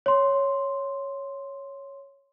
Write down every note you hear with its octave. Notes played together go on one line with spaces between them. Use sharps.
C#5 C6